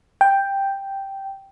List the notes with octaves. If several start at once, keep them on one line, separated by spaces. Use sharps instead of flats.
G5